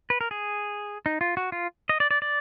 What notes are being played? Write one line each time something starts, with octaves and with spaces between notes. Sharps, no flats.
B4
A#4
G#4
D#4
F4
F#4
F4
D#5
D5
D5
D5